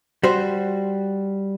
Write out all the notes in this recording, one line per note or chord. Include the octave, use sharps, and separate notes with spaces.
G3 F#4 C5